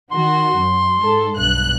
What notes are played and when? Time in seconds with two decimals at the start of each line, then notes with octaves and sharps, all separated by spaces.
0.12 D#3 F#4 C6
0.56 F#2
1.02 G#2 A4
1.37 B1 G2 F#6